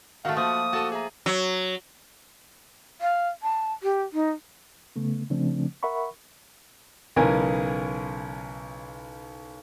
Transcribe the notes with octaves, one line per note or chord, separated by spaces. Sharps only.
D#3 A3 F#4 F5 F#5
F3 A#3 D#6
F#4 A4 A5 D#7
G#4 E5 A#5
F#3
F5
A5
G4
D#4
C#3 A3 B3
C#3 F3 A3 C4 D4
A#4 E5 F#5 B5 C#6
B1 C#3 E3 A#4 G#5